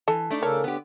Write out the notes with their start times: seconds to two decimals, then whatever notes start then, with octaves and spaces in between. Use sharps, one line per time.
0.08 E3 A4 A5
0.30 A3 D4 D#4
0.43 C#3 A4 A#4 C#5
0.64 D3 B3 G4